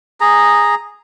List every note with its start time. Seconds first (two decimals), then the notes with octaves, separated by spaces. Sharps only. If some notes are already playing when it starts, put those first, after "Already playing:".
0.21 G#4 A#5